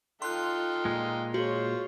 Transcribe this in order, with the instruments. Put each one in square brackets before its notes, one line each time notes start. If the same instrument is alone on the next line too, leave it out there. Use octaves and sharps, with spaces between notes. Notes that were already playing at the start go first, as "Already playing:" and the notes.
[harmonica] D#4 F5 G5 [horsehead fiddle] F4 A4 [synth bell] C6 F#6
[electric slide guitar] A#2 G#3
[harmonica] F4 C5 [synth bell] F#4 [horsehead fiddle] G#4 C#5